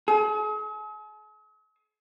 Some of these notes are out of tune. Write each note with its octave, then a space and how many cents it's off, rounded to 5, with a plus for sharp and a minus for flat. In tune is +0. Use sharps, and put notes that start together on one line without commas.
G#4 +45